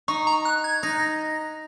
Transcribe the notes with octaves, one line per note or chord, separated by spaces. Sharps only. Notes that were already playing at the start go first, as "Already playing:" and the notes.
D#4 C#6
A#5
F#6
G#6
D#4 A#6